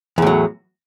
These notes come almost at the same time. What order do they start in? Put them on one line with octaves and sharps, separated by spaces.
E2 A2 F#3